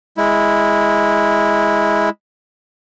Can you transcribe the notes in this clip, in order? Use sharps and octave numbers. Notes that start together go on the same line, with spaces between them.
G#3 E4